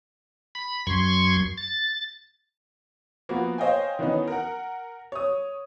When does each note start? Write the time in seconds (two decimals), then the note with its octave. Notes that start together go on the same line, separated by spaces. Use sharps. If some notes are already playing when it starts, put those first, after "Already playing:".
0.55 B5
0.87 F#2 C6 C#6 G#6
1.58 A6
3.29 F3 A#3 B3 F#4
3.58 C5 C#5 D#5 F5 G5 G#5
3.99 D#3 E3 B3 C#4 D#4
4.28 A#4 F#5
5.12 C#5 D#6